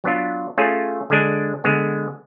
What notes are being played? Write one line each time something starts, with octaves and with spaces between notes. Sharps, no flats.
F#3 B3 D4 F4
A3 C#4 F4 G#4
D3 G#3 D4
D3 G#3 B3